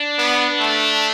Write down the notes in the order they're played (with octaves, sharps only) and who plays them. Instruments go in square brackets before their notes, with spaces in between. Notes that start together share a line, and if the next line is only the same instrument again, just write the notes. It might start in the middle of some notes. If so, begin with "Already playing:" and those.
Already playing: [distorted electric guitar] D4
[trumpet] B3
A3